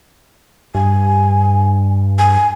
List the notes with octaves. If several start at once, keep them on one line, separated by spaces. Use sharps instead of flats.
G2 G#5
G#5